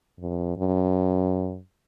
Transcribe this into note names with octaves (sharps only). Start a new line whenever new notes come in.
F2
F#2